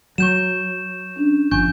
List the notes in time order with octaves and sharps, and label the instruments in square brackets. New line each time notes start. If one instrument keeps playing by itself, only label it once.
[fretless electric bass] F#3 [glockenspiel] C#6 G6 E7
[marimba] C#4 D4
[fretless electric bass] G1 [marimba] F3 [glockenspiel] G#5 C#6 G6